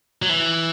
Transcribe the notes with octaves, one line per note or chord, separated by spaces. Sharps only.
F#3
E3